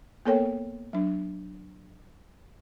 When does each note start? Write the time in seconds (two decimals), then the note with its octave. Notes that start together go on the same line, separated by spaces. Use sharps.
0.26 A#3 B3 A4 A#4 C#5 G5
0.93 F#3 D4